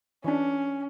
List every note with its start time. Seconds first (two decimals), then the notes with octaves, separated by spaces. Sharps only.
0.24 E3 C#4 D4